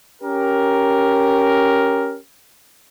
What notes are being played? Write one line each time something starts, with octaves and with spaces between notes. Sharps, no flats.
C#4 G4 A#4